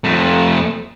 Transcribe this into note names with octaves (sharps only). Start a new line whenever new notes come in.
F2 A3